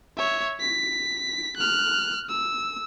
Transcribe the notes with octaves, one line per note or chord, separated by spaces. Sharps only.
C#5 E5
B6
F6 F#6
E6